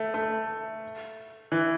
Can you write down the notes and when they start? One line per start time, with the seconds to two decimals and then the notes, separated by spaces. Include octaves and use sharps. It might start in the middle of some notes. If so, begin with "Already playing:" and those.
Already playing: A3
0.14 A3
1.52 E3